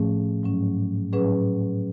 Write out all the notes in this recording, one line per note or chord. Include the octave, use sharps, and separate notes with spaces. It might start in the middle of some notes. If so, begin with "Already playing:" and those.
Already playing: A2 F3 A3 C#4 G#4
G#2 F#3 C#4
A2 F#3 C#4 G#4 B4